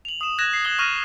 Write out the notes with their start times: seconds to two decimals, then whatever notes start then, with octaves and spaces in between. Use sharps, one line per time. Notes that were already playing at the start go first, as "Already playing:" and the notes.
0.05 F7 F#7
0.21 D#6 E7
0.39 F#6 G#6 A#6 E7
0.53 C7
0.65 D#6 G#6 F#7 G7
0.79 C#6 F6 A#6 D#7 F7